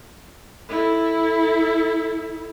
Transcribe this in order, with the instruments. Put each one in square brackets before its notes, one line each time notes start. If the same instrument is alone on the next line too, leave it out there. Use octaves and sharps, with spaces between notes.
[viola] E4 A4